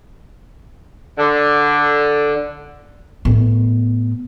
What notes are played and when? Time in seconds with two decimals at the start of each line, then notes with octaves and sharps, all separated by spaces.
1.18 D3
3.25 A2 B3